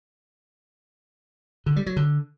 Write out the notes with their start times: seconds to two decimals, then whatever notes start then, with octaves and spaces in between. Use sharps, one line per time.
1.66 D3
1.76 G3
1.86 F#3
1.96 D3